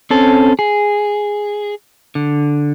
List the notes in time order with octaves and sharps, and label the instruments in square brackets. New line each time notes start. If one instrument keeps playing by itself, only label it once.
[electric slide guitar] C4 C#4 A4
G#4
D3